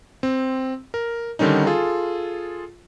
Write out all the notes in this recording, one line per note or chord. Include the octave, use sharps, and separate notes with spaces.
C4
A#4
D3 D#3 G3 C#4 D#4
F4 G#4 A4